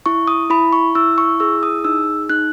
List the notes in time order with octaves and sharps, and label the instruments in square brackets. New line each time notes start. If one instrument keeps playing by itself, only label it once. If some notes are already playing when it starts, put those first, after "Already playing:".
[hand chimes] E4 C#6
D#6
E4 B5
C#6
E4 E6
C#6
G#4 E6
D#6
D#4 E6
D#4 F#6